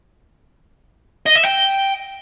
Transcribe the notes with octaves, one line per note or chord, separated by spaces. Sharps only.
D#5
E5
G5